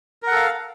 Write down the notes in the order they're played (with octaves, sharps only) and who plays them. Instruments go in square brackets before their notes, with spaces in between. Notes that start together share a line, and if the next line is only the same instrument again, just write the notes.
[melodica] A#4
F#5
A4
F5